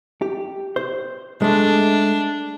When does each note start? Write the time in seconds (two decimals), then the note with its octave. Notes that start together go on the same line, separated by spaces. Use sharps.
0.22 G4
0.76 C5
1.42 G#3 A3 D4